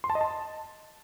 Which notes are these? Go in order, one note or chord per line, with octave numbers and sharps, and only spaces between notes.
C6
A5
D#5
A5